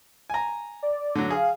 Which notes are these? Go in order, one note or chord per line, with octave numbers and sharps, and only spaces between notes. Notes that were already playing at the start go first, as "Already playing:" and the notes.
G#5 A#5
D5
A2 D3 F#3
G#4 F5